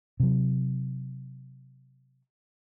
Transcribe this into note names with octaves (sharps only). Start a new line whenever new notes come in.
C3 F#3